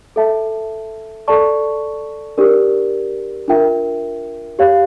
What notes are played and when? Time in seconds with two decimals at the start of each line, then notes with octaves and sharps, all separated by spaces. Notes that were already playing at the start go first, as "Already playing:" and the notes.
0.16 A4 E5 A5
1.28 A4 D5 A5 C#6
2.38 D4 G4 A#4 D5
3.48 D4 F4 A#4 E5 G5
4.59 G4 C#5 F5